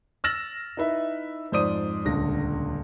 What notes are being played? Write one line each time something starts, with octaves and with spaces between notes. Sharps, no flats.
E6 F6 A6 A#6 E7 F#7
D#4 E4 B4 E5
F2 G#2 C5 D5 D#6 D#7
D#1 C#2 D3 A#6